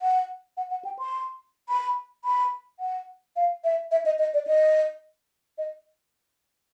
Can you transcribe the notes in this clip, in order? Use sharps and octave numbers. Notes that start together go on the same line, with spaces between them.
F#5
F#5
F#5
G5
C6
B5
B5
F#5
F5
E5
E5
D#5
D#5
D5
D#5
D#5